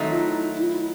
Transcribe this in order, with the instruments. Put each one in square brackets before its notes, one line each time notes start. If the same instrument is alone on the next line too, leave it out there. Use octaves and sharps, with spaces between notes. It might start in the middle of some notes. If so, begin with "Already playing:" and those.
Already playing: [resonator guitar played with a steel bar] D#3 F#3 A3 C4 D#4
[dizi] F4
E4
E4
F4
E4